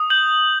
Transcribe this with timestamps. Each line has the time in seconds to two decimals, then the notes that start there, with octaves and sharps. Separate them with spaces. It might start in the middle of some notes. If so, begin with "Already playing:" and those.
Already playing: D#6
0.10 G6 F#7